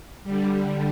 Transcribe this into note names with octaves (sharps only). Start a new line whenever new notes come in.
D3 G3